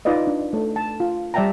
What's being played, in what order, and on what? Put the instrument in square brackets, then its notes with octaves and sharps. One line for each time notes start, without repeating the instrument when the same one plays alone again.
[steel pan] D#4 F4 B4 D5 D#5
D4
A3 A4
A5
F4
G3 D5 E5 G5 A5 A#5